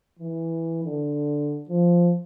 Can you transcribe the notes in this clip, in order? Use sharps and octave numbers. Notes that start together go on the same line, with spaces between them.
E3
D3
F3